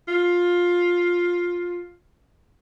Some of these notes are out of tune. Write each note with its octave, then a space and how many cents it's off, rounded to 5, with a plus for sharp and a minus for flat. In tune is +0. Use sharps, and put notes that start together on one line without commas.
F4 +10